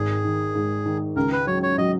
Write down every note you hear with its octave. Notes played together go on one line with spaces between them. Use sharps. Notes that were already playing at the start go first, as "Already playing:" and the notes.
Already playing: G#1 D#3 G#4
D#3
G#2
D#3
C#2 A#4
B4
F#3 C#5
C#5
F#3 D#5